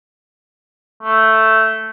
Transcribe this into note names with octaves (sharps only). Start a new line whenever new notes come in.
A3